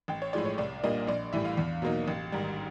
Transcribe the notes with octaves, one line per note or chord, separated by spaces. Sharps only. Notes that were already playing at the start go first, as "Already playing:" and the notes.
A1 G5
C#5
A2 F3 G#3 D5
C#5
C2 D5
A#2 G3 A#3 D4 D#5
A#1 D5
A2 E3 G3 E5
F5
E2
B2 F#3 A#3 D#4
A1
G#2 D#3 G3